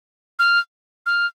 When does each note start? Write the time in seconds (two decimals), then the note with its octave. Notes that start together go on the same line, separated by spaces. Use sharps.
0.39 F6
1.06 F6